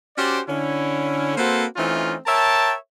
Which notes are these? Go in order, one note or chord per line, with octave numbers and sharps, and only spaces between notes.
C#4 F#4 G4 C5 D5
D3 C#4 E4
A#3 C4 F#4 A4 B4 C5
E3 A3 C4 C#4 D#4 F4
A#4 C#5 E5 G5 A5